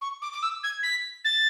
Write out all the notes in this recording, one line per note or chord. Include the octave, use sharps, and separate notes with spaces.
C#6
D6
D6
E6
G#6
B6
A6